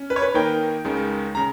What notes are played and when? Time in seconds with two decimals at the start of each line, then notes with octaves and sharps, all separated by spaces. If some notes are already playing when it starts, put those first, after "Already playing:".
Already playing: C#4
0.10 B4
0.16 C#5
0.22 B4
0.34 D#3 A#3 D#4 A#4 G5
0.85 C#2 C#3 G#3 D#4 A#4
1.35 C#3 A#5